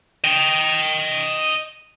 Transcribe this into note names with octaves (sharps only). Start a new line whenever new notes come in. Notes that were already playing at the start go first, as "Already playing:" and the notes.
D#5 G5